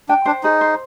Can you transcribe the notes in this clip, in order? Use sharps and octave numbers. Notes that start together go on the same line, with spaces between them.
D4 G5
D4 C5
D#4 G#4
C5